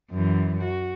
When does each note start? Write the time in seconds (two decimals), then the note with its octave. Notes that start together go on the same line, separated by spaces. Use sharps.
0.11 F#2 E3
0.64 F#4